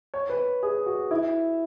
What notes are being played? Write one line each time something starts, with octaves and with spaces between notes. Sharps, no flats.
C#5
B4
G#4
F#4
E4